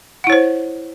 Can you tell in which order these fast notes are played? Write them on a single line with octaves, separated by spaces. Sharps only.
F#5 E4 C#5 C5